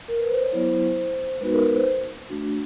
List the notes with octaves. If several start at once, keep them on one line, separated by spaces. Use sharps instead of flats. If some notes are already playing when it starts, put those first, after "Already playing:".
A#4
B4
C5
C#5
F#3 B3 E4 C5
G#3 B3 D#4 F#4 B4
A#4
B4
C5
A3 D4 F#4